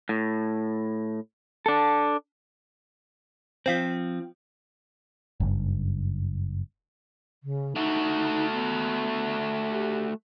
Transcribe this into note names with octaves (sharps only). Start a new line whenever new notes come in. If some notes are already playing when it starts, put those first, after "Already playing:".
A2
D4 A4
F3 C4 C5 F5 B6
F#1 G2
C#3
A3 D#4 F#4
B3
G4